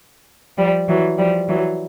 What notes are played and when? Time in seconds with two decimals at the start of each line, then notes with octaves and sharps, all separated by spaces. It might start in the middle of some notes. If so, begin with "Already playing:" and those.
0.58 F3 G3
0.88 E3 F#3
1.18 F3 G3
1.49 E3 F#3